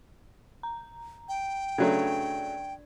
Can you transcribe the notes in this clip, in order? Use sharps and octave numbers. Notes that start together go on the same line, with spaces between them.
A#5
G5
C#3 F#3 A3 D4 D5 G#6